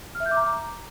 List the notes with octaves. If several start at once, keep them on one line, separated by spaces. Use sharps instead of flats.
F6
E5
G6
D6
A#5